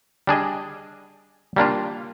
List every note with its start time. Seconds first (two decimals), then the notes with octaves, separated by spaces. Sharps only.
0.27 G3 D4 G#4 D#5
1.56 G3 A#3 D4 F4